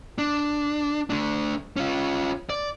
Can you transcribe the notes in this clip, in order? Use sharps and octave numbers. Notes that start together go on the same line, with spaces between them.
D4
A3 D4
C#4 F4
D5